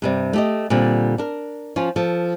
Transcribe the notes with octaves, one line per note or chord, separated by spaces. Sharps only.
G2 C3 G3
A3 G4 D#5
A#2 D3 G3 C4
D4 A#4
F3 C#4 F4
F3 A4